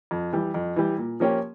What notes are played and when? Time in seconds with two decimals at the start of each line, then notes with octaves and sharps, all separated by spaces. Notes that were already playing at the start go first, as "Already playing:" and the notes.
0.11 F2
0.33 E3 G3
0.54 F2
0.76 E3 G3
0.98 A#2
1.20 F3 A#3 C#4 G4